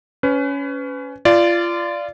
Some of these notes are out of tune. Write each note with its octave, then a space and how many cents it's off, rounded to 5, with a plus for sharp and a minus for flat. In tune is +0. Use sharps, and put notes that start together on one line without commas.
C#4 +15 B4 +30
F4 -25 D5 +0